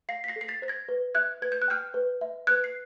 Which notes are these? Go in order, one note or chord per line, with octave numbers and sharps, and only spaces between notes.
F5 A#6 C7
B6
A#6 C7
A4
C7
A6 B6
C5 A6
G#6 A#6
B4
E5 F#6 G#6
B4 G#6
G6
F#6
G5 F6 G6
B4
E5
B4 F#6 G#6
C7